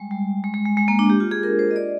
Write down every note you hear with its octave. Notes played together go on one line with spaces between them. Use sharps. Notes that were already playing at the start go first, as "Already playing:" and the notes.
Already playing: G3 G#3
G3
G#3
G#3
G#3
G#3
A#3
D4
G4
F4
G#4
A#4
C5
D#5
D5